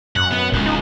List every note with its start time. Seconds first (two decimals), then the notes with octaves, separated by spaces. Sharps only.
0.16 F#2 F#5
0.31 B3
0.52 D#1 C#2
0.66 D#4